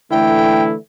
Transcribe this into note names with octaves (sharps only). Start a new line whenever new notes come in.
D3 E3 A3 E4 G5